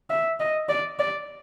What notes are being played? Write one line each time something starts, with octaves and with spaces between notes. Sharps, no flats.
E5
D#5
D5
D5